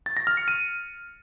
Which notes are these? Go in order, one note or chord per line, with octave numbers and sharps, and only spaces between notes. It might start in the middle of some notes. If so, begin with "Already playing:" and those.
A6
A#6
F6
C#7
D#7